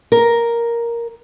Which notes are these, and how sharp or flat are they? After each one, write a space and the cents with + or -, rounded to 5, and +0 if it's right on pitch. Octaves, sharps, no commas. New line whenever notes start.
A#4 +5